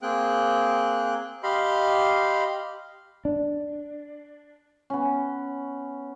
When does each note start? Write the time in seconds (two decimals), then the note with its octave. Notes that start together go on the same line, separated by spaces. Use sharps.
0.02 A#3 C4 G#4 G5 F#6
1.43 G4 D#5 F5 B5 C6
3.25 D4
4.90 B3 C#4